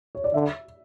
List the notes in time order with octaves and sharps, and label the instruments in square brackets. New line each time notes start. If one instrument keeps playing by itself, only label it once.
[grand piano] C#5
D5
[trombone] D3 [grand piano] E5